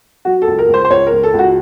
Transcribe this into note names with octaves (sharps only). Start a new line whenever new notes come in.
F#3 F#4
A4
C#2
A#4
C#2
C5
C5
C#2 C#5
A#4
C#2
A4
C#2
F#4